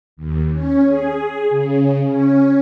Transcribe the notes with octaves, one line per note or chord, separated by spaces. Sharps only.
D#2
C#4
G#4
C#3
C#4